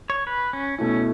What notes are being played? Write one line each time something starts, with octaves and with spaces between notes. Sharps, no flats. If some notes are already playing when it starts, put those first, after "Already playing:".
C#5
B4
C#4
B2 A3 C#4 E4